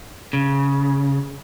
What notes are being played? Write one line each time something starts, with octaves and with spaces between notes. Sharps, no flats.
C#3